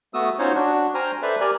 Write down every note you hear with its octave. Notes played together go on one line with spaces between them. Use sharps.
A3 B3 F#4 D#6 E6
C#4 D#4 F4 F#4 C5 C#5
D4 F#4
C5 G5 G#5 A#5 F6
A4 B4 C5 D5 E5
G4 A#4 D5 G#5